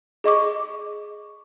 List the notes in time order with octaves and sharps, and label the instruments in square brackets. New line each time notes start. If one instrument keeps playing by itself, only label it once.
[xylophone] G#4 D#5 C#6 D6